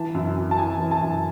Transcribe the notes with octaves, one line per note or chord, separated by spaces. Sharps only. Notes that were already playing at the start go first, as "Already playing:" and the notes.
Already playing: E3 A5
F#2
F#2
A5
E3 G#5
E3
A5
F#2